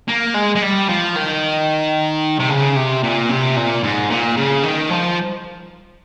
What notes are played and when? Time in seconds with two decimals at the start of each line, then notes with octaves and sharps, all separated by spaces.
0.08 A#3
0.34 G#3
0.55 G#3
0.62 G3
0.88 F3
1.15 D#3
2.39 C3
2.49 C#3
2.76 C3
3.03 A#2
3.29 C3
3.56 A#2
3.83 G#2
4.10 A#2
4.37 C#3
4.63 D#3
4.90 F3